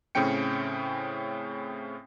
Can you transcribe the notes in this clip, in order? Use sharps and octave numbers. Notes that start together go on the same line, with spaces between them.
A2 C#3 C4 C#4 G5 C#7